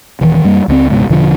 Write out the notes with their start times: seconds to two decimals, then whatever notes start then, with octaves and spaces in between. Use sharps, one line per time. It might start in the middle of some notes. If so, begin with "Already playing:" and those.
0.21 D#1 D#3 E3
0.44 F#2 G3 A#3
0.68 C#2 G#3 C4
0.90 C#2 G#2 B2
1.10 E1 B2 D3 F3